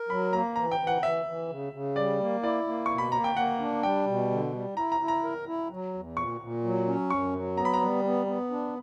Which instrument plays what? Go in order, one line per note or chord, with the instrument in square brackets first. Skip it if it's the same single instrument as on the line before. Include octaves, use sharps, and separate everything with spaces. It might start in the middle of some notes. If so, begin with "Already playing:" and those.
Already playing: [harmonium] A#4
[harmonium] F#3 [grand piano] B5
[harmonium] A#3 [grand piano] A#5
[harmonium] E3 [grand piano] A#5
[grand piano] G5
[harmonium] E3
[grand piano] F#5
[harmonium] E3 [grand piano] E5
[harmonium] E3
C#3
C#3
[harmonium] G3 [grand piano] D5
[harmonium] A#3
[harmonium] E4 [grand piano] D5
[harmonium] A#3
[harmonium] B2 [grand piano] C#6
[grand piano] B5
[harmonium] A#3 [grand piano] A#5
[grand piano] G5
[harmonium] A#3 [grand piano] F#5
[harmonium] D4
[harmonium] G3 [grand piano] G5
[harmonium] B2
D3
G3
[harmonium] E4 [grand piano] A#5
[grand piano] A#5
[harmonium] E4
[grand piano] A#5
[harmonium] A#4
E4
F#3
E2
[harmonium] A#2 [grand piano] C#6
[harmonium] A#2
F#3
C#4
[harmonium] F#2 [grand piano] C#6
[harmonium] F#3
[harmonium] B3 [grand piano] A#5
[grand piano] B5
A#5
[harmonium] G3
B3
B3
D4